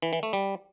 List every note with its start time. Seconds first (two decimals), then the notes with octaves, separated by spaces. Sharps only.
0.02 E3
0.13 E3
0.23 A3
0.33 G3